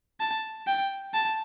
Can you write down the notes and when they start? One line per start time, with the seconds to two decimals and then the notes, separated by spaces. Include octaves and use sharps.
0.20 A5
0.67 G5
1.14 A5